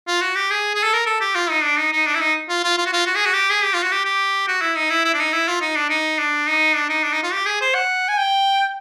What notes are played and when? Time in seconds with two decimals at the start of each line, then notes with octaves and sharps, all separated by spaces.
0.07 F4
0.21 F#4
0.35 G4
0.50 G#4
0.75 G#4
0.83 A4
0.93 A#4
1.06 A4
1.21 G4
1.35 F4
1.50 D#4
1.63 D4
1.78 D#4
1.92 D#4
2.06 D4
2.15 E4
2.21 D#4
2.49 F4
2.64 F4
2.78 F4
2.86 F#4
2.93 F4
3.06 F#4
3.15 G#4
3.25 F#4
3.34 G4
3.50 G#4
3.63 G4
3.74 F4
3.83 F#4
3.92 G4
4.05 G4
4.48 F#4
4.61 E4
4.76 D#4
4.90 E4
5.05 E4
5.14 D4
5.20 D#4
5.33 E4
5.48 F4
5.61 D#4
5.76 D4
5.90 D#4
6.19 D4
6.47 D#4
6.75 D4
6.89 D#4
7.03 D4
7.13 D#4
7.23 F4
7.33 G4
7.46 G#4
7.61 C5
7.74 F#5
8.08 G#5
8.18 G5